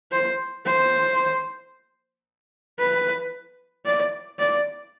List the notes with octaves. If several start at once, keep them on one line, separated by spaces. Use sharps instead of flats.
C5
C5
B4
D5
D5